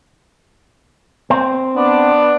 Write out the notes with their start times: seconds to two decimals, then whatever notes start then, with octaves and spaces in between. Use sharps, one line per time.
1.30 C4
1.76 B3 D4